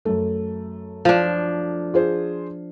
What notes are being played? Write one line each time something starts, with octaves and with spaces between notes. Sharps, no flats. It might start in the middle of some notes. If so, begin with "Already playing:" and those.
F#2 A3
F3 D4
F4 G#4 C5